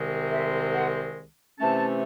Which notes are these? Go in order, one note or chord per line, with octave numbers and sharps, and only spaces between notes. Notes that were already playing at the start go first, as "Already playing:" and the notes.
Already playing: C2 C3 D#3 G#3 C4
E5
F#5
C3 E3 A3 C#4 A5